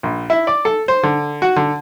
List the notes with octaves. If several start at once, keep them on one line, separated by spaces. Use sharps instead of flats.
A#1
E4
D5
A4
C5
D3
F#4
D3